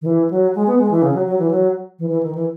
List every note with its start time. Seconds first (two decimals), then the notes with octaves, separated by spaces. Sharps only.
0.02 D#3
0.06 E3
0.31 F#3
0.55 G#3
0.67 B3
0.79 G#3
0.91 E3
1.02 C#3
1.14 F#3
1.27 F#3
1.39 E3
1.51 F#3
1.99 E3
2.10 E3
2.23 D#3
2.35 E3